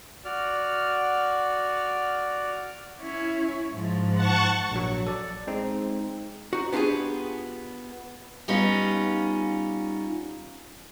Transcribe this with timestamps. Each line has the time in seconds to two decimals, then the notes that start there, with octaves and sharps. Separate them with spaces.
0.25 F#4 D5 F6
3.01 C#4 E4
3.73 G#2 F3
4.15 F#5 A5 C#6
4.72 A#1 F#3
5.07 A4 D5
5.47 G#3 C4 D#4
6.53 D#4 F#4
6.73 B3 D4 F4 G4 G#4
8.48 G3 B3 C#4 D#4 F4